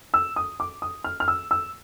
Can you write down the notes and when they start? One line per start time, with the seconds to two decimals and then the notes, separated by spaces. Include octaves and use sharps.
0.14 E6
0.36 D#6
0.60 D6
0.82 D#6
1.04 F6
1.20 F6
1.28 E6
1.51 E6